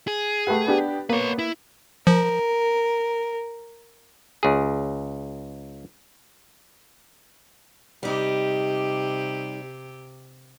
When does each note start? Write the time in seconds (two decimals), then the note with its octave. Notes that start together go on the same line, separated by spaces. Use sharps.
0.08 G#4
0.47 A3 G4 B4 F#5
0.66 B3 D4 G4
1.10 A#3 B3 B4 C#5
1.39 E4
2.07 F3 A#4
4.43 C#2 G#4
8.03 C3 G3 D#4 G4